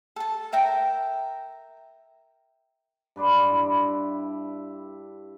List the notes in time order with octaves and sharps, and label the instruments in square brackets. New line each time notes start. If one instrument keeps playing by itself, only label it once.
[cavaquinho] A4 A5
A#4 E5 G5 A#5
[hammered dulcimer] G2 B4 D5 C6
E4 E5 B5